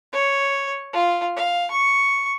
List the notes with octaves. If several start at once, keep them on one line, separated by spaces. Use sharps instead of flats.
C#5
F4
F5
C#6